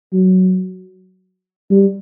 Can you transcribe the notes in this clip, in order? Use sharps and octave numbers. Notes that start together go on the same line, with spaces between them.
F#3
G3